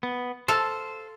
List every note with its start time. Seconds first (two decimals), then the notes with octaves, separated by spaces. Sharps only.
0.03 B3
0.48 A4 C5 F5